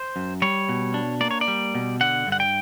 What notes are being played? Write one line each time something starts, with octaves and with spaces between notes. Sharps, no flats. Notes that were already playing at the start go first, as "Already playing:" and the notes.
Already playing: C5
F#2
G3 C#5
B2
D4
A#3 D5
C#5
D5
G3
B2
D3 F#5
G2
F#5
G5